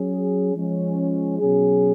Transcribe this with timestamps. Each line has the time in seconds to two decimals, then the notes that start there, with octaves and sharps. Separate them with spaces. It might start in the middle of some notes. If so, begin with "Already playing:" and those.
Already playing: F#3 C#4 G#4
0.54 F3 G#3 C#4
1.39 B2 F#3 C#4 G#4